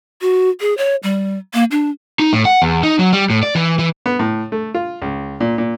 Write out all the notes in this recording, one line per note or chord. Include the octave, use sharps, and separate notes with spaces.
F#4
G#4
C#5
G3
A#3
D4
D#4
A2
F#5
E2
D#4
F#3
G3
A2
D5
E3
E3
B3
A2
A3
F4
C#2
A#2
A#2